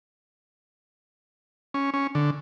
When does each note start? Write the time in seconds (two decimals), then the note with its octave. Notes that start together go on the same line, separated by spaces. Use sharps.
1.74 C#4
1.94 C#4
2.15 D3